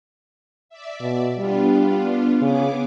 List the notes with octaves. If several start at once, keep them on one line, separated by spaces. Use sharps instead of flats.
D5 E5
B2
G3 B3 D4 F4
C#3 B3 G#4 D6